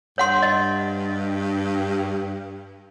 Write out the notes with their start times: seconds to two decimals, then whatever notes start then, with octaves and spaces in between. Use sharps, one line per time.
0.18 G2 C#5 F#5 C6
0.42 D#5